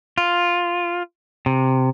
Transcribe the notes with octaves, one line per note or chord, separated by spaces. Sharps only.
F4
C3